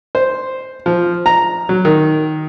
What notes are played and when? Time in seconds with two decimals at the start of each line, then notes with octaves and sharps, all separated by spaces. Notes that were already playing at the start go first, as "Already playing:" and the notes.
0.15 C5
0.86 F3
1.26 A#5
1.69 F#3
1.85 D#3